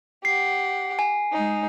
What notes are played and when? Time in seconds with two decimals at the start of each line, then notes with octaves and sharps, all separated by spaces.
0.25 G4 F#5 C7
0.99 G#5
1.32 G#3 D#4